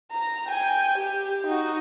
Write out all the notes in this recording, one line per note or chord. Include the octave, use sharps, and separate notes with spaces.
A#5
G5 G#5
G4
D#4 F#4